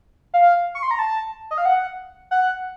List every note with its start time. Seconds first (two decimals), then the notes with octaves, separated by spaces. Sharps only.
0.34 F5
0.75 C#6
0.83 C6
0.91 A#5
0.99 A5
1.51 D#5
1.58 F5
1.65 F#5
2.31 F#5